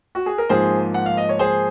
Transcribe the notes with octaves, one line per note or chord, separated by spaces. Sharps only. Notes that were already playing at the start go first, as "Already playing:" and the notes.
F#4
G#4
A#4
G#2 F3 A#3 G#4 C5
F#5
F5
D#5
C#5
G#4 C5